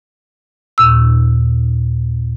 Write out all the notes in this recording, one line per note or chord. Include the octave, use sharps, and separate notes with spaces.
D#2 A#2 E6